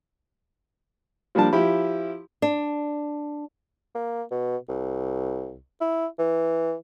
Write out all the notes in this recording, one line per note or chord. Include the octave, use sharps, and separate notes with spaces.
F3 G3 A#3 D4 A5
F3 E4 G4 B5
D4
A#3
B2
C2
E4
E3